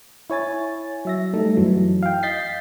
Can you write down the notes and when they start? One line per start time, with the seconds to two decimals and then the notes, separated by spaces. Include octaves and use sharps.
0.30 E4 C#5 G#5 A6
1.05 F#3 E5 A#6
1.33 G3 A3 D#4 A4
1.56 F#2 E3 F#3
2.03 F5 G5
2.23 D#5 G6 A6 B6 C7